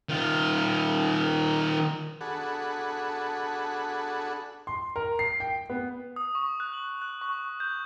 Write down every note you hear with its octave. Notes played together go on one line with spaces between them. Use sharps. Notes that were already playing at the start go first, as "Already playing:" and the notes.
D#3 F4
D4 F#4 G#4 A4 F#5 B5
C6
A#4
C7
G5
B3
D#6
C#6
F#6
F#7
F#6
C#6
C#6
G6